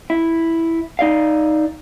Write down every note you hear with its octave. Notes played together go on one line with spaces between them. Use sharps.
E4
D#4 D5 F5